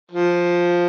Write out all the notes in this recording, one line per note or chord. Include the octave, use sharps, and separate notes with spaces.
F3